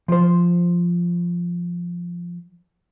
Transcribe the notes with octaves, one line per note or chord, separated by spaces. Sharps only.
F3 C5